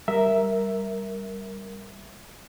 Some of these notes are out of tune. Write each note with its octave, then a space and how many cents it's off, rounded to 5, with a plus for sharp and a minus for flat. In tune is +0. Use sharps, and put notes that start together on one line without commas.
G3 +0 A#4 +0 E5 +0